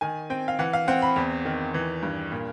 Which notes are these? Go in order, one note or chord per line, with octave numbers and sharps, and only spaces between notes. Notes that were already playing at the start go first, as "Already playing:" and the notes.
D#3 G#5
C4 G5
F5
E3 F#5
F5
C4 F#5
B5
E2
D#3
E3
G2
A#2